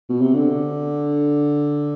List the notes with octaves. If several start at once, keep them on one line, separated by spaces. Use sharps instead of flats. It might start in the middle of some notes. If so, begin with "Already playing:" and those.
B2
C3
D3